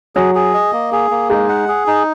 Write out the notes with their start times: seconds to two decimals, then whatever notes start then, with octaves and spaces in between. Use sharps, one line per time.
0.15 F#3 G#4
0.35 G#4
0.54 D#5
0.73 A#3
0.92 G#4
1.11 A#3
1.30 G#3 D#4
1.49 F#5
1.68 G#4
1.87 D#4